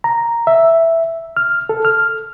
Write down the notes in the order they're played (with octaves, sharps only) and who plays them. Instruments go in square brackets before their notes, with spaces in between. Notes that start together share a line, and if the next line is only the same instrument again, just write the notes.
[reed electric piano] A#5
E5
F6
A4
F6